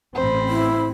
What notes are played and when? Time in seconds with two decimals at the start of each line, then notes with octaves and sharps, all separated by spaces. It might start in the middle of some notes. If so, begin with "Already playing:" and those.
0.14 A1 C4 C5 B5
0.49 E4